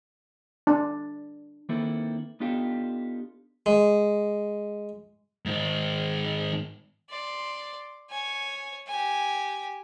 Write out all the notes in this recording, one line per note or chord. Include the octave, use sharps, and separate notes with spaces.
D4
D#3 A#3 C4 E4 A4 B4
B3 D4 D#4 F4 G4 A4
G#3
G#2 D#3
D5 C6
C#5 G#5
G4 G#5